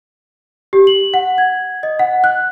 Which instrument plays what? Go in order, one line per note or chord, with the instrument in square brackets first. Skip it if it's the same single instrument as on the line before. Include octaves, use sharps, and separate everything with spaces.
[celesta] G4
F#7
F#5
G#6
D#5
F#5
F#6